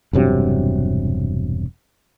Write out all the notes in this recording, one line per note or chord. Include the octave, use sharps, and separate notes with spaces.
E1 G2 C3 F#3